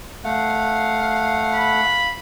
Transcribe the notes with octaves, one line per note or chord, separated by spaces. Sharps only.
A3 F5 F#5
B5